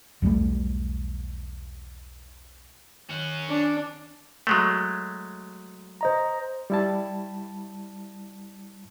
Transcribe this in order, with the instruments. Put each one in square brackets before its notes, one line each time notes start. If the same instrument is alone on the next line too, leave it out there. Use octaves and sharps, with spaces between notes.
[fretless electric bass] B1 E2 G3 A3
[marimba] D#3 [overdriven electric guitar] C#4 F#4
[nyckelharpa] D4
[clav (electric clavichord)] F#3 G#3 A3
[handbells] C5 D#5 A#5
[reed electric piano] G3 E4 A5